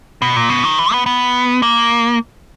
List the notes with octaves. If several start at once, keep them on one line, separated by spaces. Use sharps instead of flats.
B2
A#2
B2
D#3
E3
B3
B3
A#3